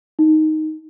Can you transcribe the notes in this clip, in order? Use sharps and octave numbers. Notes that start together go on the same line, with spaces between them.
D#4